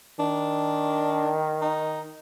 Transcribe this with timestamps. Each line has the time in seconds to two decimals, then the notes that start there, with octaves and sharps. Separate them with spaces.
0.19 D#3 D4
1.61 D#4